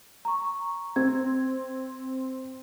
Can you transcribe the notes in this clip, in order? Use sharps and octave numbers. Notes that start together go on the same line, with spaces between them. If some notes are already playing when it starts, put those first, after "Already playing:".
A#5 C#6
C4 G#6